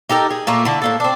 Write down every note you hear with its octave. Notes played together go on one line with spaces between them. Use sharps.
D#4 G4 A4 A#4
G#4
A#2 A3 A#3
D3 E4
A2 A#3 A4
C4 D4